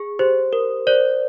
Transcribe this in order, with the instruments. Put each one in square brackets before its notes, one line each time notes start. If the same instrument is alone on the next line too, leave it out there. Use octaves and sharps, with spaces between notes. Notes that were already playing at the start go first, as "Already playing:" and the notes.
Already playing: [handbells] G#4
[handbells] G4 [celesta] C5
[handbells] A#4
[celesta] C5 [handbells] D5